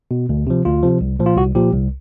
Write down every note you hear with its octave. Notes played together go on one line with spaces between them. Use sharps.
B2
D2
C3 F3
D2 F4
C3 F3
C2
A#2 F3
F4
C2 F#4
A#2 F3 G4
C2